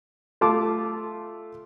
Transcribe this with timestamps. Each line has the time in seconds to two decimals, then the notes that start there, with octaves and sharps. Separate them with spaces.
0.41 A3 F4 A5 D6